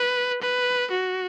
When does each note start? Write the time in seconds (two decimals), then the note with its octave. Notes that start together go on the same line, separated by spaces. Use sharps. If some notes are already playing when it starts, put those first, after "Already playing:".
Already playing: B4
0.42 B4
0.91 F#4